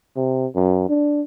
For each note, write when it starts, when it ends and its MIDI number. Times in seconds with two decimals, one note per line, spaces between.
0.16 0.47 48
0.56 0.85 42
0.89 1.22 62